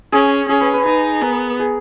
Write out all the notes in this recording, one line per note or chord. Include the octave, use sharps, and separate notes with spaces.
C#4 G#4
C#4 G#4
B4
B4
D#4 B4
B3 A#4
G#4